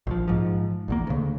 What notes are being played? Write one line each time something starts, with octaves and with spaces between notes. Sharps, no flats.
A#1 F3
G#2 F3
A#1 E2 A#3
D2 C#3